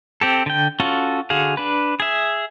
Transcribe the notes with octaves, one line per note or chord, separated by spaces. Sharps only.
C4 G4 A4
D3 G5
C#4 F4 F#4 A4
D3 F#4 G#4 F5
D4 B4
G#4 E5